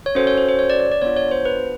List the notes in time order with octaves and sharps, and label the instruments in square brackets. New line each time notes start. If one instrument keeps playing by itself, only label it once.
[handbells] C#5
C#4 F#4 A4 C5
C#5
C5
C5
C#5
D5
D5
D5
B3 D4 F4 C#5
C#5
C5
B4